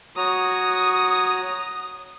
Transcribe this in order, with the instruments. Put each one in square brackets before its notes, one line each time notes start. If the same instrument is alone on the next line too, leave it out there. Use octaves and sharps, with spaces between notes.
[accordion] F#4 C#5 A#5 [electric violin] D#6